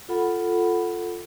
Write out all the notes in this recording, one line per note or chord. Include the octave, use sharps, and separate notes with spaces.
F4 A4 F#5 B5